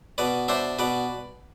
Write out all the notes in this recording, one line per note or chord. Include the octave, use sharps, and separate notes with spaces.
B2 B4 D5
D4 C5 E5
B2 B4 D5